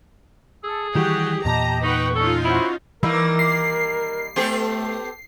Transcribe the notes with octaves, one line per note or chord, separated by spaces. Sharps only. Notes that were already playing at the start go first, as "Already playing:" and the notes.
G#4 A4 E6
D#3 E3 G3 F#4 G4
E2 A#2 G4 D#5 A5 A#5
D#4 B4 F#5 G5 C#6
C#4 D#4 F4 A4
E4 F#4 C5
D#3 E3 G3 A#3 A#4
C7
A3 B3 G4 A4